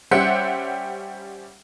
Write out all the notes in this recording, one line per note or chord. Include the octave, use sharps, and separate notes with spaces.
G3 C#4 G4 C5 E5 F#5